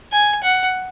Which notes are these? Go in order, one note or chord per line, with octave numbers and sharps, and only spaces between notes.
G#5
F#5